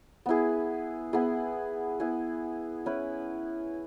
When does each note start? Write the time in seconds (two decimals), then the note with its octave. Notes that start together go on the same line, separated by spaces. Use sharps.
0.26 B3 E4 G#4
1.13 B3 E4 G#4
2.00 B3 E4 G#4
2.86 C#4 E4 B4